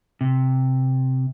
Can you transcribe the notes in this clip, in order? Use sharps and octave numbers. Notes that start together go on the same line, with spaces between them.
C3